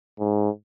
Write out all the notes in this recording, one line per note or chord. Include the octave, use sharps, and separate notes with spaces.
G#2